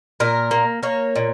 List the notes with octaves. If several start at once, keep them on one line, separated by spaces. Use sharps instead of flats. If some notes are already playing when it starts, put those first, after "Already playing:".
A#2 A#4
A#3
A#3 C#5
A#2